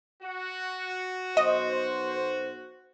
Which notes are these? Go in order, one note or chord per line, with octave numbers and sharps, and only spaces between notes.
F#4
B1 C5 D#5